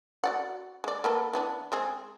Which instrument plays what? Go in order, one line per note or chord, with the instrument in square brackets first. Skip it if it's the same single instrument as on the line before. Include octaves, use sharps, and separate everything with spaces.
[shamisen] F#4 D5 F#5
G#3 D5
A#3 B3 A4
E3 B3 D4
G#3 C4 G#4